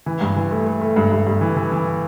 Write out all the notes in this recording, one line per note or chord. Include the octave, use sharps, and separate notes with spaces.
E3
G2
E3
A3
A3
A3
G2
G2
G2
E3
E3
E3